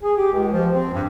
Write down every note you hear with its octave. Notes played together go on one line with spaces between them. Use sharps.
G#4
G4
C#2
F3
C4
G2